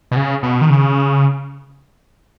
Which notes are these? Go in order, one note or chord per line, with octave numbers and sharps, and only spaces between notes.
B2
C#3
B2
D#3
C#3